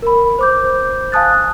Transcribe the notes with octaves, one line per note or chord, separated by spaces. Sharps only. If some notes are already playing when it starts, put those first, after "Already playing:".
A#4 B5
C5 D6 G6
F5 G#5 A5 D#6 F#6 A6